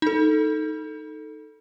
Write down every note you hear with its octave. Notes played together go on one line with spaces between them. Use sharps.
D#4 A4